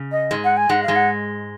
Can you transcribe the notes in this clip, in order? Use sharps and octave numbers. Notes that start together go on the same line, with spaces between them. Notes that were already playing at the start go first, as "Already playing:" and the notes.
Already playing: C#3
D#5
G#2 G#3
F#5
G#5
G#2 G#3 F#5
F5
G#2 G#3
F#5